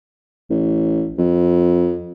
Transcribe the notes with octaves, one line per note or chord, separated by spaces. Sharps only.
A1
F2